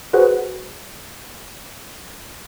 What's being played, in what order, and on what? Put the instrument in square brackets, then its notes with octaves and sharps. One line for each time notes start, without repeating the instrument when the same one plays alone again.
[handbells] F#4 G#4 B4 C5 F#5